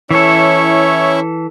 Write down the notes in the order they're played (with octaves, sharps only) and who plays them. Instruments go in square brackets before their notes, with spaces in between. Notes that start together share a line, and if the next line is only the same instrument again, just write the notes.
[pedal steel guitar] E3 A4 [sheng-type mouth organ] C#4 E4 E5 [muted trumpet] C#5